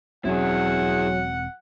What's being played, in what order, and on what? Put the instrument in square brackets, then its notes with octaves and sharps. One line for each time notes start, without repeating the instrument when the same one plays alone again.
[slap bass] E1 C4 C#4 [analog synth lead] F#3 [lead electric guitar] E4 G#4 [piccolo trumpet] F#5